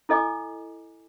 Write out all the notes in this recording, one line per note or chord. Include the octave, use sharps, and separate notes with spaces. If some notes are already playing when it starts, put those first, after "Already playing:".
E4 A4 D#5 G#5 D6